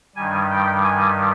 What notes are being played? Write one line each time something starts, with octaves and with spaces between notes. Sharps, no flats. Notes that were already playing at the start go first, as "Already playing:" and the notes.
G2 D#3 G3 G#5
G5
G#5